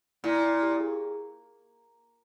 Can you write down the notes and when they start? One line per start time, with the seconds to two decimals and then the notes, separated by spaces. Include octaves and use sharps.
0.24 A#2 E4
0.44 E4
0.63 G4
0.80 G#4